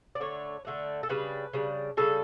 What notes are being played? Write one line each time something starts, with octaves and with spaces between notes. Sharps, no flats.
D5
D3 A3 D4 C#5
D3 A3 D4
A4
C#3 G3 D4 B4
C#3 G3 D4
C#3 G3 D4 A4